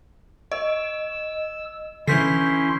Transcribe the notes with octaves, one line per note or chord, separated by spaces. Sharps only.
D#5 E6
D3 E3 C#4 E4 C6 G6 B6 C7